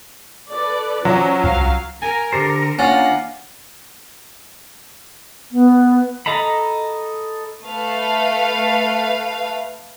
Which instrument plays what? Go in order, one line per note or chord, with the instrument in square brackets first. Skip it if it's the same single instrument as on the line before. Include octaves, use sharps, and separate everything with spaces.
[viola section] A4 B4 D5
[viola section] F3 C#4 [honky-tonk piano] F#3
[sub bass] C2 [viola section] F5
[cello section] A#4 [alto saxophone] G#5
[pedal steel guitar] D3 A4 C5 [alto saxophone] G4
[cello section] A#3 [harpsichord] C#4 [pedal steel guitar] D4 F4 [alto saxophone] F#5
[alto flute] B3
[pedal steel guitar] A4 D#5 A#5 B5
[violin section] A3 B4 F5